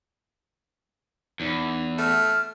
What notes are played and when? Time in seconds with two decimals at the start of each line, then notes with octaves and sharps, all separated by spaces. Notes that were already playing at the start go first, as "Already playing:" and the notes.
1.40 E2 D#4
1.98 A3 F6